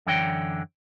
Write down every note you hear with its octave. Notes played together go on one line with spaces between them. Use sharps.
F#2 D3 E3 C#5 D5 G5